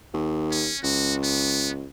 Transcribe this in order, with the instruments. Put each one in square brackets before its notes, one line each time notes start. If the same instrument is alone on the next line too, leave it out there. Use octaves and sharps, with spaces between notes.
[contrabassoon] D#2
[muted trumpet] C#4
[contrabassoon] C#2 [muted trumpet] F#4
[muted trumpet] B3